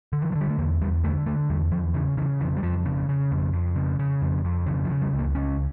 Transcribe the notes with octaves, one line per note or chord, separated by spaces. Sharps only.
D3
E3
F3
D3
G3
A3
E2 A#3
E2 G3
D3 A3
D3 A3
E2 G3
E2 F3
C#3 E3
C#3 E3
F2 E3
G3
F2 F3
C#3
C#3
F2
F2
C#3
C#3
F2
F2
C#3 E3
F3
C#3
G3
C#2
A#3
C#2 C#4